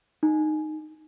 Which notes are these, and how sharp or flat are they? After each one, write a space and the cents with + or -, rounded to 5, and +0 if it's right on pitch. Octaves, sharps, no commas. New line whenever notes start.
D#4 -10